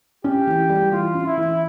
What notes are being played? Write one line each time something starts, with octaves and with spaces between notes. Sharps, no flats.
C#4 G4
E3
G3
E3 F4
C#4
E4
E3